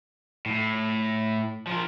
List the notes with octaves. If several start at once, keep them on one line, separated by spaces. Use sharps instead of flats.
A2
F3 A#4